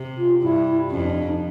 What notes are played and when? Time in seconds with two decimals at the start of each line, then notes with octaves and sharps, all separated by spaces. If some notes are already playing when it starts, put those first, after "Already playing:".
Already playing: C3
0.17 F4
0.42 G2 E4
0.91 F2 C#4
1.03 D4
1.16 D4
1.28 D#4